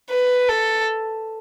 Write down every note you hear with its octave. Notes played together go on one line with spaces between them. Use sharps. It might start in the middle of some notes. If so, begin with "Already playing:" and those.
B4
A4